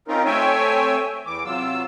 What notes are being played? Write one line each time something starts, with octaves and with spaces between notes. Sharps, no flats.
C4 C#4 D#4 F4 A#4
A3 C4 C#5 E5 G5 G#5
E2 E3 D6
C3 F#3 F4 E6